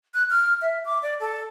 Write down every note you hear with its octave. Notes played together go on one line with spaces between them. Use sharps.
F#6
F6
E5
D6
D5
A4